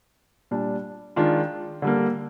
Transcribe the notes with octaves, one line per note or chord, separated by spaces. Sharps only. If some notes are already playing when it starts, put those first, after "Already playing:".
A#2 G3 D4
D#3 G#3 D4 F4
D3 G3 A#3